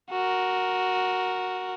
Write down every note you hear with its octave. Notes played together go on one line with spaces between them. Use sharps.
F#4 A#4